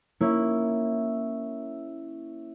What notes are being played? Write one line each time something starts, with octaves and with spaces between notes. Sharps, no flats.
A#3 C#4 E4